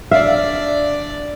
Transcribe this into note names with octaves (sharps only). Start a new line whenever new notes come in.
D4 D5 E5 F5